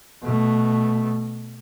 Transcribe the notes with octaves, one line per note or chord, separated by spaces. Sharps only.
B2 A3